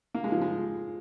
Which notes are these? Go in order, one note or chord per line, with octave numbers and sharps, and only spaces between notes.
A#3
G#3
F3
G#3